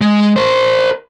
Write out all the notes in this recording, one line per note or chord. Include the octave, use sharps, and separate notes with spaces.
G#3
A#4 C5